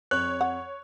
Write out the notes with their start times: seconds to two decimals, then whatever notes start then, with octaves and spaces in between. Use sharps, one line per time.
0.11 F2 C#5 F#6
0.41 F#5